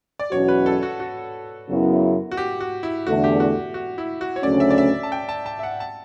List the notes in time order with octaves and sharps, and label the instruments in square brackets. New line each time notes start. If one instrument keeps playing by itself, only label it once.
[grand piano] D5
[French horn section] E2 B2 F#3 C#4 F#4 [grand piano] C#5
[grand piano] B4
A4
F#4
F#4
[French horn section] F#2 C#3 F#3 B3 E4
[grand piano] F#4
G4
F#4
E4
[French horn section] E2 D3 A3 [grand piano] F#4
[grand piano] G4
F#4
F#4
E4
F#4
C#5
[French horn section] D2 C#3 F#3 A3 C#4 [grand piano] D5
[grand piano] E5
D5
E5
A5
G5
A5
A5
E5
F#5
A5